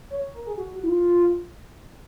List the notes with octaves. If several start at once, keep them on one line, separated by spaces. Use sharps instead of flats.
C#5
A#4
G#4
F#4
F#4
E4
F4